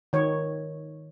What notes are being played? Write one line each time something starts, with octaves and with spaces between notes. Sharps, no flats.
D#3 C#5